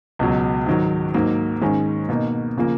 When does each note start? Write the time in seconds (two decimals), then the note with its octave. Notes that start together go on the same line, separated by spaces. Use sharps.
0.19 C#2 B2 F#3
0.66 G#2 D#3 F#3
1.14 G#2 F#3 A#3
1.61 G#2 D#3 G#3 C#4
2.09 B2 A#3 D#4
2.58 C#3 F3 A#3